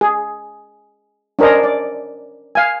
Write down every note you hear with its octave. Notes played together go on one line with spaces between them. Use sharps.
G#4
C#4 D4 A#4 C5 D#5
D5
F5 G#5